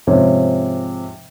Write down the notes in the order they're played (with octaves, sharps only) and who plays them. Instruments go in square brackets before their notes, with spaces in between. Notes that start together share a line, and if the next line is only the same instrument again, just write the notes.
[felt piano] G#2 C3 F3 C#4